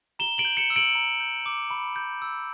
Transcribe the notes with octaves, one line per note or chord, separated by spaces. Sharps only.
A#5 E7 G7
D7 F#7
G6
C#7 E7
E6
D7 F#7
A#5
G6
D6
B5
G6
E6